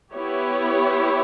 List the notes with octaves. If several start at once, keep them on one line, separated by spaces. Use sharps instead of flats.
B3 E4 G4 C#5